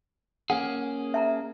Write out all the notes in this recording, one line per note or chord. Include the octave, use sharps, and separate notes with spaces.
A#3 C#4 G#4 F#5
E5 A5 A#5